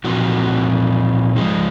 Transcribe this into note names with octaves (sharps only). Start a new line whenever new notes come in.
A#2 F3 C4 D#4 F#4
F3 G#3 D#4